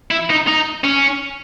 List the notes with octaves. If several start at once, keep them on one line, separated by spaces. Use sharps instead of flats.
E4
D#4
D#4
C#4